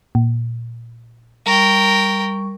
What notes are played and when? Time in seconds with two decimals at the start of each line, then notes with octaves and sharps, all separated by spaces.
0.15 A#2
1.46 G3 A#4 G5 C#6